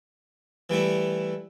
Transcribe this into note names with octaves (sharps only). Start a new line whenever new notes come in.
E3 G3 A3 E4